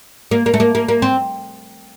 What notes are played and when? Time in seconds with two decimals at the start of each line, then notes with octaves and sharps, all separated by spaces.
0.31 A#3
0.46 A#3
0.54 A3
0.60 A#3
0.75 A#3
0.88 A#3
1.02 C4